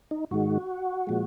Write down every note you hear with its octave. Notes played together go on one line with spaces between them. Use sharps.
D#4
G#2 D#3 G#3 F#4
A#2 F3 G#3